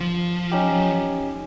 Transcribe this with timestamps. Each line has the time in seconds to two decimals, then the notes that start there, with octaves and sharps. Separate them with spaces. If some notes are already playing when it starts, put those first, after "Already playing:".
0.01 F3
0.52 C#4 D#4 G4